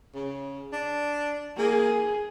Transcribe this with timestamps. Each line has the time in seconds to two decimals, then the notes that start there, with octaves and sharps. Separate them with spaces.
0.14 C#3
0.72 D4
1.57 A#3 G#4